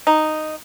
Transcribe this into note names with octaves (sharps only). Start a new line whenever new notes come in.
D#4